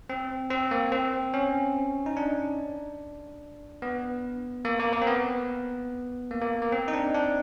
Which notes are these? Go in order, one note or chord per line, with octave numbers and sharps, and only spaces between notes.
C4
C4
A#3
C4
C#4
D#4
D4
B3
A#3
A#3
A#3
C4
B3
A#3
A#3
A#3
C4
D#4
D4
D4